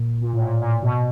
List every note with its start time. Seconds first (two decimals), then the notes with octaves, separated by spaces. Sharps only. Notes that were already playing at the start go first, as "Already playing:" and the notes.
Already playing: A#2
0.21 A#2
0.33 A2
0.42 A#2
0.62 A#2
0.83 B2